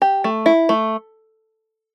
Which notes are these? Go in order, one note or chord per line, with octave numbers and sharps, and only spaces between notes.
G4
A3
E4
A3